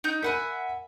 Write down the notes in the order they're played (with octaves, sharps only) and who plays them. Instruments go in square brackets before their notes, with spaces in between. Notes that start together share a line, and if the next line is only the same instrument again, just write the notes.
[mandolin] D#4 G6
[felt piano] A#4 B5 [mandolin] E5 F#5 G#5